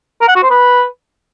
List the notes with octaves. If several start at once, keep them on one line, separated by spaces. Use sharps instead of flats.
A#4
F#5
F#4
C5
B4